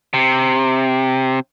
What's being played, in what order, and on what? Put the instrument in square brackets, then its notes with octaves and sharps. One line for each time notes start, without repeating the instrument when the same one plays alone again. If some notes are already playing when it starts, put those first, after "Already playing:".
[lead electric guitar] C3